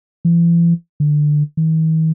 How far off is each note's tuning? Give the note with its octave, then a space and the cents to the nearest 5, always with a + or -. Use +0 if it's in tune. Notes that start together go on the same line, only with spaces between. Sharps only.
E3 +45
D3 +15
D#3 +45